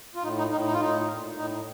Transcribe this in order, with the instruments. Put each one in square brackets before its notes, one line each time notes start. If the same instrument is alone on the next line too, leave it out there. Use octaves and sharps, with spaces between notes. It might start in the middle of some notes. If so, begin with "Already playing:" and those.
[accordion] F4
A2 D#4
D#4
A2 D#4
D#4
F4
A2 D#4
A#2
A2 D#4